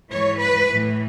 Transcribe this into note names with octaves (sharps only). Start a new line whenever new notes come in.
G#2 E3 C#5
B4
A2 E3